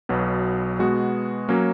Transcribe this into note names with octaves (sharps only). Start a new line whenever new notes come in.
B1 B2 F#3 B3
B2 G#3 B3 F#4
F#3 A#3 C#4